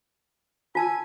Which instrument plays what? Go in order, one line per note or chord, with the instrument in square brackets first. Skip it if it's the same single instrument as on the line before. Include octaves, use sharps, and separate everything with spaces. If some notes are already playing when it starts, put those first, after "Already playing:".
[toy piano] F4 A5 E6 [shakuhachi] G#5